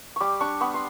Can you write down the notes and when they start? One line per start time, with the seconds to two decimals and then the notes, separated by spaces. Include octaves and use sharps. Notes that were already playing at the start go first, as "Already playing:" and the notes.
0.16 G3 C#6 D6
0.41 D4 C#6
0.61 B3 C#6
0.74 C6